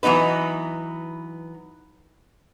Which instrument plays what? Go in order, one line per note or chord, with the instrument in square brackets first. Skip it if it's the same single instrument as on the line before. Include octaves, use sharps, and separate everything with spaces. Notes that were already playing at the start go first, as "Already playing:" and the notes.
[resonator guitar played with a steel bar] E3 F#3 B3 D#4 B4